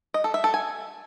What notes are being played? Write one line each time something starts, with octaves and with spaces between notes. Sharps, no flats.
D#5
A4
E5
A4
G#5